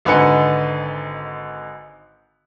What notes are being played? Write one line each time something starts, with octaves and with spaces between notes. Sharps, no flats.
G#1 D3 D#4 B4 G#5 C#7